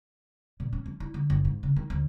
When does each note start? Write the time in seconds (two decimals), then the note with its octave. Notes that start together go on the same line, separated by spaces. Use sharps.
0.60 A#2
0.73 C#4
0.86 F3
1.00 E4
1.14 D3
1.30 F#1
1.45 G#2
1.63 C#3
1.76 D#3
1.90 D2